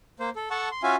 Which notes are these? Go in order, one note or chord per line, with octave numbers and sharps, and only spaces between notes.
A#3 C5
A4
A4 F#5 A5 C#6
C6
C#4 F4 F#4 E5 F5 G#5